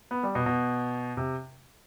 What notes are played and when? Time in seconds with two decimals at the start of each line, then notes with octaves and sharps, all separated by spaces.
0.11 B3
0.23 G3
0.35 B2
0.46 B2
1.17 C3